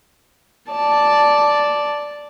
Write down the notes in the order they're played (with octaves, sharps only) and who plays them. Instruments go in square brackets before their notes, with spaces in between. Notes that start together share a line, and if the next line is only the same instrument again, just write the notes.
[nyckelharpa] D5 A5